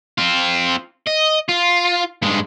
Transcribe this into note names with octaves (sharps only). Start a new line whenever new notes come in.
C4 F4
D#5
F4
G2 G#3